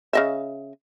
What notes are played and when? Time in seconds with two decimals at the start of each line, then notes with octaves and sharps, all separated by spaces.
0.13 C#3 D#5 E5